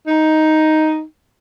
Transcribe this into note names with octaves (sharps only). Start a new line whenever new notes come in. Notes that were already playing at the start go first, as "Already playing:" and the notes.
D#4